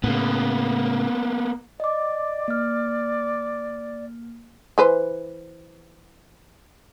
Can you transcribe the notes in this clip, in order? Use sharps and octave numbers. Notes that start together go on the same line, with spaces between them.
A2 C#3 A#3 B3
D5 D#5 D6
A#3 F6
E3 B4 C5